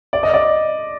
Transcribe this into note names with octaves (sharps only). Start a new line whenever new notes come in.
D5
D#5
D5